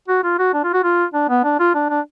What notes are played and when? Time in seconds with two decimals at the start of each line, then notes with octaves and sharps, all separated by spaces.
0.08 F#4
0.24 F4
0.39 F#4
0.54 D4
0.64 F4
0.74 F#4
0.83 F4
1.14 D4
1.29 B3
1.44 D4
1.60 F4
1.74 D4
1.90 D4